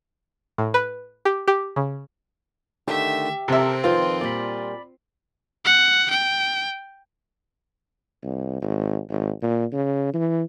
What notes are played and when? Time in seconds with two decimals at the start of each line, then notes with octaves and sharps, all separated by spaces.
0.58 A2
0.74 B4
1.25 G4
1.48 G4
1.76 C#3
2.88 D3 D#3 A3 G4 E5
3.48 C3 C4 A4 A#4 E5
3.84 F2 D#3 F3 F4 B4 C5
4.21 A#2 G3 D5 B5
5.65 F#5
6.10 G5
8.24 C2
8.62 G#1
9.10 G#1
9.42 A#2
9.73 C#3
10.14 E3